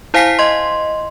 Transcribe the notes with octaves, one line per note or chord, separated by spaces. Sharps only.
E4 C5 F5 G#5 B6 C7
D#5 C6